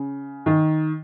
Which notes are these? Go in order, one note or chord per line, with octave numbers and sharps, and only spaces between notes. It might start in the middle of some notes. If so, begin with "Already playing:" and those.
Already playing: C#3
D#3